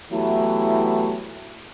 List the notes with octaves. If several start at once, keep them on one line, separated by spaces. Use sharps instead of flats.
E3 F#3 A3 B3 E4 G4